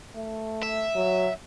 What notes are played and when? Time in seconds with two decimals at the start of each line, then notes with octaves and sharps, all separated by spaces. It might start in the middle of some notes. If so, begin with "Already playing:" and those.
0.16 A3
0.63 E5
0.96 F#3